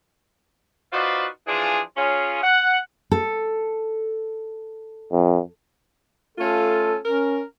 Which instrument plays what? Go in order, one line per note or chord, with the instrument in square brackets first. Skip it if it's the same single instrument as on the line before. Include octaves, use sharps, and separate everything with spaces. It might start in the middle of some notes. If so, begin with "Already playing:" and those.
[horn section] D#4 F4 F#4 B4 C5 D5
E3 F3 D4 F4 G#4
C#4 F4 G#4
F#5
[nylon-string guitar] A4
[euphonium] F2
[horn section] A3 C#4 F4 [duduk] A4
[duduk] C#4 [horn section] A#4